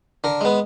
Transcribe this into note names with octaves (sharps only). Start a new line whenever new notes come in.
D3 A#4
G#3 B3